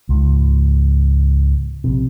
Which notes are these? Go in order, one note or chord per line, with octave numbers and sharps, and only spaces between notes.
C#2 G#2
A#1 C3